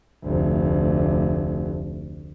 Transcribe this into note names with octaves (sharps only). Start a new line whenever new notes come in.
F1 D2